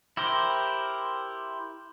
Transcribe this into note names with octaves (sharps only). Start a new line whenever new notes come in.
E4 G4 A#4 C5